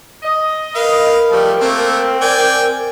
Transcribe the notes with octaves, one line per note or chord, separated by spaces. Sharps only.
D#5
A#4 B4 F5
F3 G3 A3
A3 A#3 C4
D5 G5 G#5